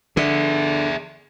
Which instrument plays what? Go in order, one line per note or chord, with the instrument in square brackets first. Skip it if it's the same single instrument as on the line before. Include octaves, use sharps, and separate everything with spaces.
[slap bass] D3 [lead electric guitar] G#4 E5